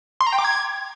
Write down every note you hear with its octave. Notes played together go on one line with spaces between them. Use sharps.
C6
A#5
G5
D6
G#6